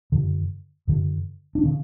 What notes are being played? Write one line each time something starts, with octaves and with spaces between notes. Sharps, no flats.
F#2 D3
F#2 D3
D4
D3 C#4